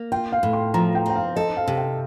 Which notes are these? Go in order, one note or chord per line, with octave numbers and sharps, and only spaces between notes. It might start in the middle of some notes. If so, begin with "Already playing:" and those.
Already playing: A#3
F4 G5
F5
A2
C6
F3 A#5
G5
C4 G5
F5
A4 D#5
F5
C3
G5